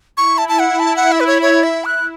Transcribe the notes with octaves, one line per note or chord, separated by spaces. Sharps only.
E4 C#6
A5
A5
F#5
E4 A5
F#5
E5
B4
C#5
C#5
E5
F#6